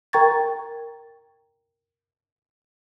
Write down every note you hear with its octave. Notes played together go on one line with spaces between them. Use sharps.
A#4 G5 A#5 C#6 G#6 A6